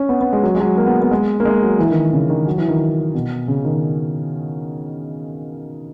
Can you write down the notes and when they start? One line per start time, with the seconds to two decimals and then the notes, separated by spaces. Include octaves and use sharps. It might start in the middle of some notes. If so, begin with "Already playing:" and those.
Already playing: C#4
0.09 B3
0.21 B3
0.33 G#3
0.43 F#3
0.55 G#3
0.60 F#3
0.77 A#3
0.86 B3
1.02 B3
1.11 G#3
1.40 A#3
1.45 G#3
1.62 F#3
1.79 E3
1.91 D#3
2.13 C#3
2.30 D#3
2.47 F#3
2.58 E3
2.68 D#3
3.14 B2
3.48 C#3
3.65 D#3